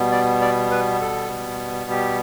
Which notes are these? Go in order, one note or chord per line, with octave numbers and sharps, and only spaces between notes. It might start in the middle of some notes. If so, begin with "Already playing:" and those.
Already playing: B2 G3 B3
D5
D5
B4
A4
G4